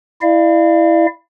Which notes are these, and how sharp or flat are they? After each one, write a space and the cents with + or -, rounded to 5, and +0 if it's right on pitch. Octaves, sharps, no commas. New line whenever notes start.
E4 +0 D5 +35 F5 -25